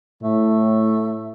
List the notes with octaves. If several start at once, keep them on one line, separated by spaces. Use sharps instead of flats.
A2 A3